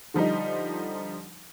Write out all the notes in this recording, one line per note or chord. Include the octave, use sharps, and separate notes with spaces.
D3 F3 G3 D#4